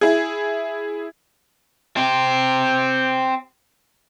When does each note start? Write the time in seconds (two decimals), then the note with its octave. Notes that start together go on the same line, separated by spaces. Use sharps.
0.01 E4 G#4
1.97 C4 G4